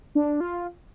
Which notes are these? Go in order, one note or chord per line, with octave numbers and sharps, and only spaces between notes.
D4
F4